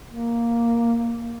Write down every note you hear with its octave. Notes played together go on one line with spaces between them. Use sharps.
A#3